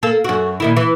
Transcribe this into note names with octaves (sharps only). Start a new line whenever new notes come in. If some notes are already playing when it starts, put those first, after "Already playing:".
A#3 A4
F#2 F#4
A#2 D#3 E4
E3